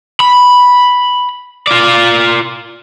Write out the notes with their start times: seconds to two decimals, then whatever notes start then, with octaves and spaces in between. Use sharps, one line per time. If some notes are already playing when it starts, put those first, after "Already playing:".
0.20 B5
1.67 F4 D5